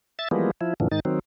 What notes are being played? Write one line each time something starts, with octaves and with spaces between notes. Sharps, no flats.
E5 A6
E3 F3 G3 G#3 A#3 B3
F3 E4
F#2 A#2 D3 E3 F3
G#2 D#3 D#4 A6
D#3 F#3 C4